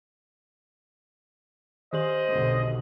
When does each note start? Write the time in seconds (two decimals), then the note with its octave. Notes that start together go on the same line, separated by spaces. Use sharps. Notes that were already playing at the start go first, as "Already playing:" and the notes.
1.93 D#3 G4 C5 D#5 F#7
2.29 B1 D3